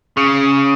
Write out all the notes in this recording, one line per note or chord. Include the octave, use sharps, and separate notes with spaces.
C#3